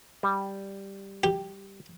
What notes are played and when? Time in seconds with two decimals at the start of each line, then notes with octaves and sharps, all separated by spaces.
0.23 G3
1.24 G4